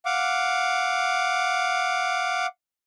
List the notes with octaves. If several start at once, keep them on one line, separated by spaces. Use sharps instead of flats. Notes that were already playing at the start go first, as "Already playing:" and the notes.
F5 F#5 D6